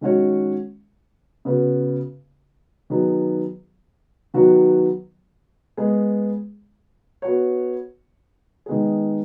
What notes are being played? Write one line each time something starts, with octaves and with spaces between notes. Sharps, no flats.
D#3 G#3 C#4 F#4 C#5
C#3 B3 F#4 B4
D#3 F#3 B3 G#4
D#3 F#3 B3 F#4
G#3 B3 G#4
B3 F#4 C#5
D#3 G#3 B3 G#4